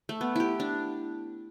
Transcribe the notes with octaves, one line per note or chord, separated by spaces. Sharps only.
A3
B3
E4 G4
D4